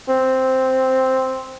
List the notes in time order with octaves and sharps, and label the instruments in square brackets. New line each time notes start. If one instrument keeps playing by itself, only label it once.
[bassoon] C4